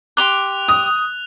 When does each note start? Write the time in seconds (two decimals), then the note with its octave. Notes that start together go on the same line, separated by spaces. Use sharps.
0.17 G4 C6 D6 F#6 F7
0.68 D#6